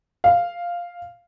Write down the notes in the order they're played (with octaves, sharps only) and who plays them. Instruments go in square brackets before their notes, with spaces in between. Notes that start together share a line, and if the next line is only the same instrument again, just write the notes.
[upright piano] F5